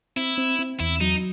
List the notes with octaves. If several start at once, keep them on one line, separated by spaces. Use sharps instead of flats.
C4 E4
C4
C4
E2 E4
F#3 D#4